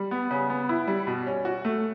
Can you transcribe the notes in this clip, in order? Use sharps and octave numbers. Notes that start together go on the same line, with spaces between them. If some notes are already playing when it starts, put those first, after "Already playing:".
Already playing: G3
B3
C#3
B3
E4
G3
B2
C#4
F#4
A3